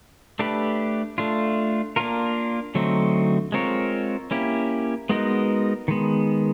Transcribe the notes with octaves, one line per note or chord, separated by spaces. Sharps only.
A3 D4 G4 B4
A3 D4 F4
A#3 D4 F4 A#4
D3 F#3 A3 C4 D#4
G#3 C4 F4 A#4 C#5
A#3 C#4 E4 G4
G#3 B3 D#4 F#4 A#4
D#3 G#3 B3